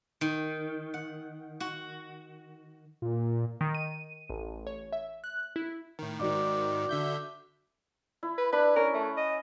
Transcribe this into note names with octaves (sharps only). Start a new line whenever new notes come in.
D#3
F#5
F#4
A#2
D#3
D#7
A1
C#5
E5
F#6
E4
A2 D#3
G#2 D#3 F#4 D5 D6
D3 E5 G6
E4
B4
D4 B4 B5
C#4 A#4
A3
D#5